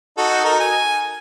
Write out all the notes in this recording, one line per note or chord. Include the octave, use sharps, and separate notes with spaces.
D#4 F#4 A4
D#4 A#4
G#5